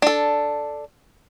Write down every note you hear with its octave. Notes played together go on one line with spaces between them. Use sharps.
D4 A4